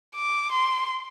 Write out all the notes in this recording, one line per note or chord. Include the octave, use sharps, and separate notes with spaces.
D6
C6